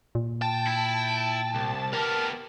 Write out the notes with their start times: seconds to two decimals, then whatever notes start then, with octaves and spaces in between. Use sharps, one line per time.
0.15 A#2
0.42 G5 A5
0.67 E4
1.55 C2
1.93 B3 G4 A#4